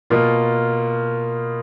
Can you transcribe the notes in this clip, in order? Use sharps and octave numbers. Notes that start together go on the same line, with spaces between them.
B2 A#3 F4